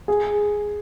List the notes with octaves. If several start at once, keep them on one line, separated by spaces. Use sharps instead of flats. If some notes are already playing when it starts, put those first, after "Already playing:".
G#4